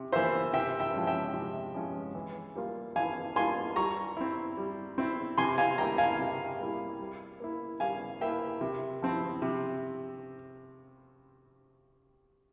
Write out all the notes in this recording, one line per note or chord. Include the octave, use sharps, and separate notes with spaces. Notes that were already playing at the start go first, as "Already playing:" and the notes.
Already playing: C3
E3 A#3 F4 C5 E5
C3 E5 G5
E5 G5
F3 G#3 C#4
E5 G5
C3
F3 G#3 C#4
E3
G3 A#3 F4
E3 F5 G#5
G3 A#3 F4 G#5 C6
G3 A#5 C#6
C4 E4
G3
C4 E4
C3 G#5 C6
F5 G#5
G3 A#3 E4 G5 A#5
F5 G#5
C3
G3 A#3 E4
G3
A#3 E4
G3 F5 G#5
A#3 E4 E5 G5
C3
F3 C4 E4
C3